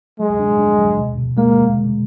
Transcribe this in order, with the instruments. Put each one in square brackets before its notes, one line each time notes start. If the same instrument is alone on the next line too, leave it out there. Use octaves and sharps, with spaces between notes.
[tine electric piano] F#3 [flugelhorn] G#3
[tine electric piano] D4
D4
F#3
B2
B2
[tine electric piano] G#3 [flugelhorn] A#3